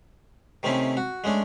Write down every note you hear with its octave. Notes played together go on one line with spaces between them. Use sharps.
C3 D#3 A3 C4 C#4 E4
F#4
G#3 A3 C#4 D4